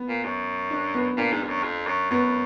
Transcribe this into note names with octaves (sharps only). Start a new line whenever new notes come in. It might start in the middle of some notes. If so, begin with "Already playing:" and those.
Already playing: B3
A#2
F#2
D4
B3
A#2 D4
G#2
F2
F#2
F2
F#2
F#2 B3